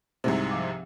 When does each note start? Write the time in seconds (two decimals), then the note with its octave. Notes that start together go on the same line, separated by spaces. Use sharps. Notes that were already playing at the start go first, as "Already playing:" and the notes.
0.24 C2 G#2 C3 C4 E4 G#4
0.51 F3 F5 D6